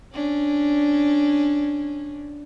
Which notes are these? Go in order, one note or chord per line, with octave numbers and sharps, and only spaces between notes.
C#4 D4